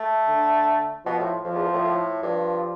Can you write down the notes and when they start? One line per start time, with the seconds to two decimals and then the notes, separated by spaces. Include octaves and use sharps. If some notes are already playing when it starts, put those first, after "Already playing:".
Already playing: A3
0.28 D3
1.05 B2 F3
1.19 A2
1.44 F2 F3
1.54 E2
1.65 F2
1.74 A2
1.84 A2
2.23 G2 F3